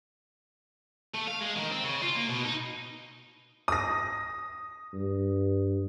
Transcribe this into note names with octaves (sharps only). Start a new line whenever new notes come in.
A3
F5
G#3
D#3
C4
C#3
F4
A#3
B2
D#4
D#6 A#6
G2